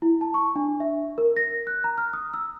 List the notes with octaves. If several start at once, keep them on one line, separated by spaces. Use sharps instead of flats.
E4
A5
C#6
D4
E5
A#4
A#6
F#6
A#5
F6
D#6
E6